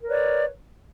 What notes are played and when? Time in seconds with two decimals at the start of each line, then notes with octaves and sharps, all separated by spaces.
0.01 A#4
0.04 B4
0.08 C#5
0.11 D5